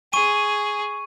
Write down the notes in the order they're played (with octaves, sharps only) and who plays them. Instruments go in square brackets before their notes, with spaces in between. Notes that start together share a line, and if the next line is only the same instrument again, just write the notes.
[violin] G#4 [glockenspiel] C#6 D#7